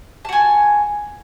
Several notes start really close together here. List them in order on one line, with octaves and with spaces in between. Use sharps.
A5 F#4 G#5